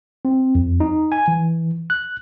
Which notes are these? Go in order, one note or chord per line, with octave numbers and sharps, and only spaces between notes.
C4
F2
D#4
G#5
E3
F#6